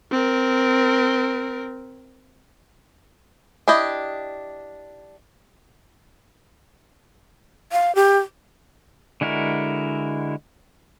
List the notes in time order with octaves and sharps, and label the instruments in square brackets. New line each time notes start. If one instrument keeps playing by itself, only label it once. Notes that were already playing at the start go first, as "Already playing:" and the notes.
[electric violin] C4 A#4
[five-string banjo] D4 E4 G4 D#5
[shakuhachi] F5
G4
[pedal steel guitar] D3 G#3 E4 F#4 A#4